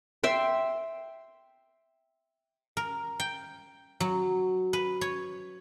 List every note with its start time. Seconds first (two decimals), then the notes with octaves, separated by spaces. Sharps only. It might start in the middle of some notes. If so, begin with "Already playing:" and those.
0.23 E5 G5 C6
2.77 A#4
3.20 G5
4.00 F#3
4.73 B4
5.01 C#5